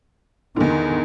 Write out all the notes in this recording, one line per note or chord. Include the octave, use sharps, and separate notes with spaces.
E2 D3 D#3